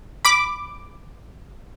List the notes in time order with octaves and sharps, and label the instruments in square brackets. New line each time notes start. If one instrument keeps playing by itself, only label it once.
[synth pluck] B5 D6